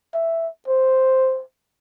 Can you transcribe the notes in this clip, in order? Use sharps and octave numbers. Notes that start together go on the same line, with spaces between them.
E5
C5